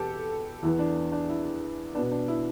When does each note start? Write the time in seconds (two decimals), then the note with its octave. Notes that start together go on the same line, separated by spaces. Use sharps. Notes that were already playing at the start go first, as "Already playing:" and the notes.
Already playing: E2 B2 G4 A4 B4
0.62 E2 E3 B3 E4
0.79 D4
1.12 D4
1.29 E4
1.95 B3 D4
1.98 B2
2.11 D4
2.28 E4